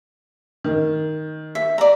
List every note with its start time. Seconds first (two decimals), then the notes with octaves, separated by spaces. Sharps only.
0.64 D#3
1.55 E5
1.78 D5 A#5